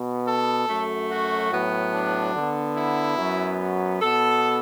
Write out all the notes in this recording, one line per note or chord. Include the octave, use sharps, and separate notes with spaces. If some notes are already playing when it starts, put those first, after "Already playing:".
Already playing: B2 B3
A4
F#2 F#3 A3
F#4
A2 F#3 B3
D4
D3 B3
E4
F#2 F#3 B3
B2 B3 A4